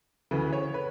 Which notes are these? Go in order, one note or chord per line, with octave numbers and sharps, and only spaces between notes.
D2 C#3 E3 B4
C#5
B4